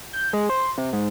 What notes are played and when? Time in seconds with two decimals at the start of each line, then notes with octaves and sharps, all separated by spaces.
0.13 G6
0.33 G#3
0.49 C5
0.78 C3
0.93 G#2